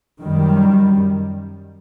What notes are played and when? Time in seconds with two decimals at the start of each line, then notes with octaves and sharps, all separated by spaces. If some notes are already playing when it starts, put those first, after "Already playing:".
0.21 F#2 D#3 G3